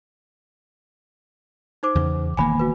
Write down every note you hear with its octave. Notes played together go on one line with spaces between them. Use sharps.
D#4 C5 D6
E2 C#3
E1 D#3 A#3 G#5 B5
F#4 B4